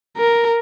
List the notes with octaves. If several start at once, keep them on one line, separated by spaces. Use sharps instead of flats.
A#4